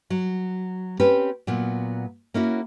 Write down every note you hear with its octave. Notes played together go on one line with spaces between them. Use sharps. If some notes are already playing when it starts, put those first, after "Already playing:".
F#3
C4 C#4 G4 B4
A#2 F#3 B3 F4
A#3 C#4 E4 F#4